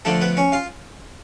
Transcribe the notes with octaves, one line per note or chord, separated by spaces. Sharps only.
D3 F3 A3 D4 A4
B3 B4
C#4 C#5
F4 F5